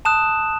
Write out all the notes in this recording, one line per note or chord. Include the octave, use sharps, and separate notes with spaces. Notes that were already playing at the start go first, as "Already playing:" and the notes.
A5 D#6 F#6 E7